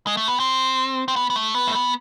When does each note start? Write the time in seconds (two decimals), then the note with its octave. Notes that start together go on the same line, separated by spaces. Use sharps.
0.07 G#3
0.17 A3
0.28 B3
0.40 C4
1.08 C4
1.16 B3
1.30 B3
1.36 A3
1.55 B3
1.67 A3
1.75 B3